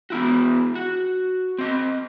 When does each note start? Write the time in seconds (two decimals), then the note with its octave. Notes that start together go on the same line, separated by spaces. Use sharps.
0.10 B3 E4 F#4
0.75 F#4
1.59 C4 D#5